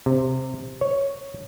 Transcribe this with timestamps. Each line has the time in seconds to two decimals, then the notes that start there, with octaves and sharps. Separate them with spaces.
0.06 C3
0.81 C#5